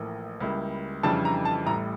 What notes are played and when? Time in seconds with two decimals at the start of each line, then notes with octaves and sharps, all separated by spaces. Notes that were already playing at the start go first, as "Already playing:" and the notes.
Already playing: A1 A2 F3 A#3
0.40 C#2 C#3 G3 A#3 E4
1.03 F2 C#3 E3 G3 D4 A5
1.25 A#5
1.45 A5
1.66 A1 A2 G3 A#5